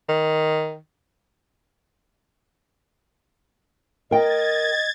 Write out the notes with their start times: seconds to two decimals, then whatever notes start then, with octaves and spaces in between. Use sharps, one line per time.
0.09 D#3
4.11 A#4 D#5 G5 G#6 A6